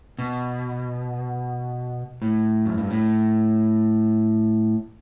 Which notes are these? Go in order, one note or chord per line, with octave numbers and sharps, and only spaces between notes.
B2
A2
F#2
G2
A2